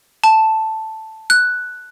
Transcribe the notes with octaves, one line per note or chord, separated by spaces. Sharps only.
A5
F#6